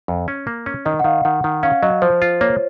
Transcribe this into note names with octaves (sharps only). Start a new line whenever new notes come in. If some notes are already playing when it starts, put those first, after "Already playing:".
F2
C#4
A#3
C#4
D#3 D#5
F#5
D#3 F5
D#3 F#5
D#3
C#4 F5
F#3 D#5
F3 C5
F4
A#3 C#5